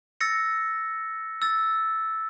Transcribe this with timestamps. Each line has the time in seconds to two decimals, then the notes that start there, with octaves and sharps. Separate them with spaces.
0.21 E6 A6 A#6 C#7
1.42 E6 A6